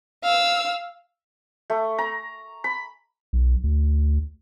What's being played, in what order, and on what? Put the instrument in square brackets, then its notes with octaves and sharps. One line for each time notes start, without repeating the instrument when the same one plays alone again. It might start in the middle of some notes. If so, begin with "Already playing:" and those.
[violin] F5 E6
[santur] A3
A#5
B5
[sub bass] B1
D2